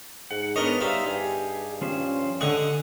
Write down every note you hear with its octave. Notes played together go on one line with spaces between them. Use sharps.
G#2 F#5
B3 D4 A#4 C#5 D#5
G3 D#4 C5 E5 F5
G2 G4 G#4
F3 C#4 C5
D3 D#5 F#5 G#5 C#6